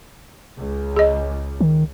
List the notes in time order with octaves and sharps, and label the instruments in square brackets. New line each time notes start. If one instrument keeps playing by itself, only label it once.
[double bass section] C#2
[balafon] G#4 D#5
[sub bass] D#3